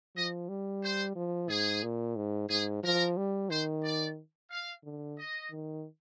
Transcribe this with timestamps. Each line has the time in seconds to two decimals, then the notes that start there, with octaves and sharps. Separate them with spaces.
0.15 F3 D#5
0.49 G3
0.82 C5
1.15 F3
1.49 G#2 G#4
1.83 A#2
2.16 G#2
2.50 G#2 G#4
2.83 F3 A#4
3.17 G3
3.50 D#3 C5
3.84 D5
4.50 F5
4.84 D3
5.18 D#5
5.51 D#3